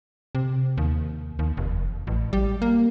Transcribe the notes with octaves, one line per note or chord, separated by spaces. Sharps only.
C3
D#2
D#2
F1
A1
G3
A#3